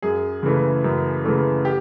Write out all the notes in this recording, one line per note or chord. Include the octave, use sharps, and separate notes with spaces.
F#2 G#4
C#3 E3 A3
F#2
C#3 E3 A3
G4